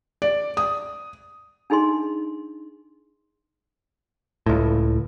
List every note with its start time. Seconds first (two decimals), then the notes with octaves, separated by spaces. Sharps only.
0.22 D5
0.57 D#6
1.70 D4 D#4 G#4 D#5 C6
4.46 C#2 A2